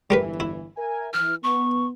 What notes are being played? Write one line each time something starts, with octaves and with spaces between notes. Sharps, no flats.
G1 E3 G3 A#4 B4
E4
A#4 E5 G#5
E3 F6
B3 C#6